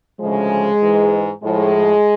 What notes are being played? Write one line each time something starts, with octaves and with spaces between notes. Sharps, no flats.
D2 C#3 F3 G#3
G#2 E3
A2 F3 G#3